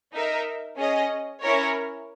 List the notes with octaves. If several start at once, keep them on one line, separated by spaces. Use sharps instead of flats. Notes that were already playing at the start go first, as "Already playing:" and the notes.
D#4 A#4 E5
C#4 G#4 D#5
C#4 E4 A#4 C#5